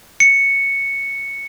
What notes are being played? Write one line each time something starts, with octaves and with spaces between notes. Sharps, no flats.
C#7